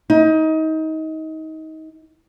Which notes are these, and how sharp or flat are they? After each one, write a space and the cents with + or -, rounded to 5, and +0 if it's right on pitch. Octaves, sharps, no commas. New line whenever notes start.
D#4 +25